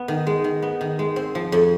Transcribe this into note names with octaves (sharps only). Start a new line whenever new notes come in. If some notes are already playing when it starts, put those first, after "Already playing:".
Already playing: B3
D#3
G#3
D#3
B3
D#3
G#3
C4
F3
F2